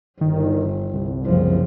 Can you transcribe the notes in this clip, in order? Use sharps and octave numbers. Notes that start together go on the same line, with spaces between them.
G1 D#3
C2
F#1 F3